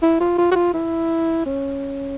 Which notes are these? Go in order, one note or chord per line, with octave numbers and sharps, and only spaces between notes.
E4
F4
F4
F#4
F4
E4
C#4